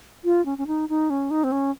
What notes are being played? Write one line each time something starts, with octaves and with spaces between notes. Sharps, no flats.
F4
C#4
C#4
D#4
D#4
C#4
D#4
C4
C#4